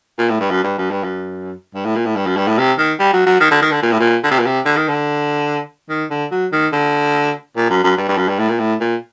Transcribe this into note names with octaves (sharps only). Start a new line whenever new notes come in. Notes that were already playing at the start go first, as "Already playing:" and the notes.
A#2
A2
G2
F#2
G2
F#2
G2
F#2
G2
A2
A#2
A2
G2
F#2
G2
A2
C3
D#3
G3
F#3
F#3
D#3
D3
D#3
D3
A#2
A2
A#2
D3
C3
A#2
C3
D3
D#3
D3
D#3
D3
F#3
D#3
D3
A#2
F#2
F#2
G2
G2
F#2
G2
A2
A#2
A2
A#2